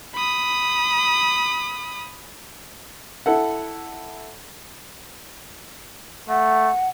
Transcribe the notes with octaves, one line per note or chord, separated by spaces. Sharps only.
B5 D#6
E4 A4 F#5
A3 F#5